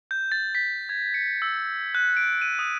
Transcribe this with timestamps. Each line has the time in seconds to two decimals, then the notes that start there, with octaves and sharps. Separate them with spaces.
0.11 G6
0.32 A6
0.55 B6
0.89 G#6
1.14 C#7
1.42 E6
1.95 F#6
2.17 D7
2.42 D#7
2.59 D#6